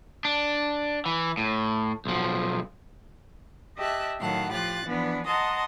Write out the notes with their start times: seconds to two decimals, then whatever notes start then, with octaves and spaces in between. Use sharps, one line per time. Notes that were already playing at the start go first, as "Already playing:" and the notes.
0.25 D4
1.06 E3
1.37 A2
2.05 B1 F3
3.77 G4 D#5 E5 A5 F#6
4.20 A2 D#3 F#3 F5 F#5 A5
4.51 F3 F4 G4 F#6 A6
4.84 E3 F3 B3 D4
5.25 D#5 F#5 A5 A#5 C6 D#6